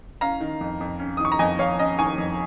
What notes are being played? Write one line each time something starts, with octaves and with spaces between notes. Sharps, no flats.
C#4 F5 A#5
D#3
F2
F2
C#4
D#3 D#6
C#6
A#5
F2 D#5 G#5
F2 C#5 F5
C#4 D#5
D#3 G#5 C#6
F2